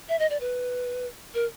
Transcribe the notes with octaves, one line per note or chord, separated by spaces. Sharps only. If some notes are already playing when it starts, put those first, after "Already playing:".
E5
D#5
D5
B4
A#4